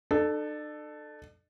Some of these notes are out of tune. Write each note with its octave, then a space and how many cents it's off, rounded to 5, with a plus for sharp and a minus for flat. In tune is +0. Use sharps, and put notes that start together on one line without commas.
D4 +45 A4 +0